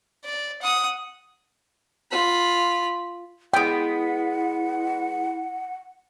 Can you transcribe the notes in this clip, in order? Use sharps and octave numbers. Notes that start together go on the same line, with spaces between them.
D5
F#5 D#6
F4 B5
G#3 B3 E4 F#5 G5